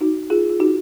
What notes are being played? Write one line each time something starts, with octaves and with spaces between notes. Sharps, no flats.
D#4 F#4
F4 G#4
F4
D#4 F#4